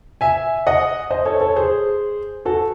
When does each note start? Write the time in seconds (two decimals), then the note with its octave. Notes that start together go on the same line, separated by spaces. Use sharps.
0.21 E5 G#5
0.67 D#5 F#5
1.11 C5 D#5
1.25 A4 C#5
1.41 A4 C#5
1.56 G#4 C5
2.45 F#4 A4